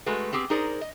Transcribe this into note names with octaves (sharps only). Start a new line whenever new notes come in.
G#3 A3 F#4 B4
B3 C4 G4 G#4
D#4 G#4 A#4 C5 D5
D#5